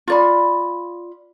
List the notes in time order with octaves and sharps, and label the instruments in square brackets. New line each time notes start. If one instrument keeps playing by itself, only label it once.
[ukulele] F4 D5 B5